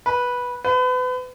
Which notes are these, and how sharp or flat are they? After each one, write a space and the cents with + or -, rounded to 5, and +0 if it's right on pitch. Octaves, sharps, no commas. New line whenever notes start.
B4 -10
B4 +35